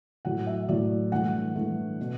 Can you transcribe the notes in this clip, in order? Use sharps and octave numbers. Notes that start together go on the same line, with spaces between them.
A2 F#3 A3 F#5
E5
A2 F#3 A3 D5
G2 E3 A3 F#5
G2 E3 A3
B2